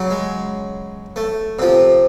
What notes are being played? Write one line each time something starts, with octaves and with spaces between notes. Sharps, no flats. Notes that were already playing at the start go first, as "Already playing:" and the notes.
Already playing: C#3 F#3
G#3
A3
C3 F3